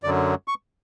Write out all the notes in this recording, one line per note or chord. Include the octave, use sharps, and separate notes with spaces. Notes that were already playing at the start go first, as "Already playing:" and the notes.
F#2 D3 F#3 D5
C#6